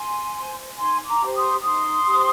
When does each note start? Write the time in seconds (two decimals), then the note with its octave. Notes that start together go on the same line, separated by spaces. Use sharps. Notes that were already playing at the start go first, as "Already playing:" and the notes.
Already playing: G#5 C6
0.34 C5
0.77 D#4 G#5 C6
1.05 A#5 D6
1.21 G4 C5
1.34 C6 D#6
1.63 D#4 C6 D#6
2.06 G4 C5